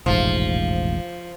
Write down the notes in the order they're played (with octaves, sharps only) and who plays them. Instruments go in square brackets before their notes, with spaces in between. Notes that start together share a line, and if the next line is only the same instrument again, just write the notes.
[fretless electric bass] E1 A1 G#2 [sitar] F3